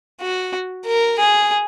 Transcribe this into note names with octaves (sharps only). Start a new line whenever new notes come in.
F#4
A#4
G#4